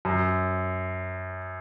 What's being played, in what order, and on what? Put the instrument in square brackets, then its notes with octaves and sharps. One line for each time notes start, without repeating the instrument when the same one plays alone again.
[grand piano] F#2